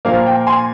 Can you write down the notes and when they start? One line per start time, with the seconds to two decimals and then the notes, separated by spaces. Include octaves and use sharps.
0.05 A#2 F3 A#3 F5
0.26 G5
0.47 G#5 C6